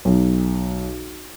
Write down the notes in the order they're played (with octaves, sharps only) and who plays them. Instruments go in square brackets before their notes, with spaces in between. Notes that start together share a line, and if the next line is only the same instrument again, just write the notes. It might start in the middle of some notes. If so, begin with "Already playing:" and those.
[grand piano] B1